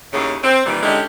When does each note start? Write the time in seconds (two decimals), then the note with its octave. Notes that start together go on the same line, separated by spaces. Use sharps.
0.13 D#2 A2 C#3
0.44 C4
0.66 A#2 D#3 E3 G3
0.83 D3 G#3 C#4 D#4 E4 G4